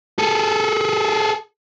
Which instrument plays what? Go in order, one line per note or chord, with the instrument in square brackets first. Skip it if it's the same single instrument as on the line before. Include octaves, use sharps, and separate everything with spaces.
[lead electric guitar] G#4 A4